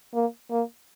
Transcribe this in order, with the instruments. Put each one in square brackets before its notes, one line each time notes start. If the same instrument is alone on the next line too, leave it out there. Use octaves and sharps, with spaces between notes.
[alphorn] A#3
A#3